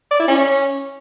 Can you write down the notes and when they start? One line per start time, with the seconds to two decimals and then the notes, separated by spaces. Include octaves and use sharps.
0.11 D5
0.19 E4
0.28 C#4